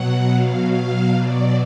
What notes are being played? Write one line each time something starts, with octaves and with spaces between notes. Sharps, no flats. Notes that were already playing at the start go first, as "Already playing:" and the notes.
Already playing: B2 F#3 F#5
F5
F5
D5